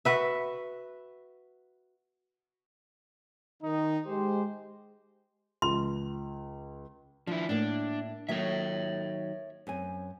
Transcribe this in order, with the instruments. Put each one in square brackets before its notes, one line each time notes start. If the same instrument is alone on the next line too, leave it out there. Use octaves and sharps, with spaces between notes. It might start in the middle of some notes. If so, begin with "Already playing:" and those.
[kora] F#4 B4 E5
[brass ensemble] D#3 D#4
G#3 G4 C5
[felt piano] C#2 [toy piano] C6
[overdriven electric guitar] F3 E4 [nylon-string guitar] D4
[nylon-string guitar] A2 A#3 [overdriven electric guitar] D4
[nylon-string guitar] D#3 F#3 A#3 [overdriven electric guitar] C#5 E5
[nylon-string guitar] F#2 C4 G#5